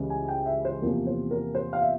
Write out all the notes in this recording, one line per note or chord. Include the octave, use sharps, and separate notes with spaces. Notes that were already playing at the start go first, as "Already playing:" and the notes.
Already playing: C#2 C#3 E3 G3 C#4
G#5
G5
E5
C5
E2 C3 F3 A#3 A#4
C5
A#4
C5
F5
E5